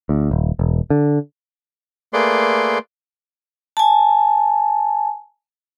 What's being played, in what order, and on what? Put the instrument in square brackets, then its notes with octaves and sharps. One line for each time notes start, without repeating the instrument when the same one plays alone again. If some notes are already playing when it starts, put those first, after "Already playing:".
[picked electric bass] D2
D#1
E1
D3
[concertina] A3 A#3 G#4 B4 D5 C6
[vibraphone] G#5 A5